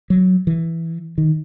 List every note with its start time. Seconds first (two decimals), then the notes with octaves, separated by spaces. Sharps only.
0.10 F#3
0.47 E3
1.18 D#3